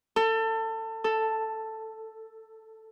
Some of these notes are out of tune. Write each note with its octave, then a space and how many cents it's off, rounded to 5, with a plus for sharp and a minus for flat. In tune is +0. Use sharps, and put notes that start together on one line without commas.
A4 +25
A4 +5